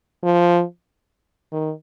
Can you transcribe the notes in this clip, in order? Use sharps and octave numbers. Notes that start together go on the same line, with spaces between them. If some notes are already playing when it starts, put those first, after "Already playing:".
F3
D#3